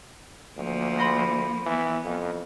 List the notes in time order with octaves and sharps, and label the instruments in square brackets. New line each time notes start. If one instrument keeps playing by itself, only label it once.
[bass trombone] D2 [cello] F3 A#3
[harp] B5 C6 A#6
[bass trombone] E3 [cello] B3
[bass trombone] F2